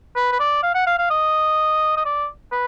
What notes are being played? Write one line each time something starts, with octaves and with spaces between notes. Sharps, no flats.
B4
B4
D5
F5
F#5
F5
F5
D#5
D#5
D5
B4